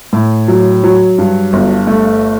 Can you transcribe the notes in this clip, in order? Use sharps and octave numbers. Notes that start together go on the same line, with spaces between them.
A2
F#3
F#3
G2
G1
A3